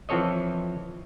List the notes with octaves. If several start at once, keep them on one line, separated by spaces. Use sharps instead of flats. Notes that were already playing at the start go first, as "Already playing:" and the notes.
E3 F3 C4 A4 C#5 D#5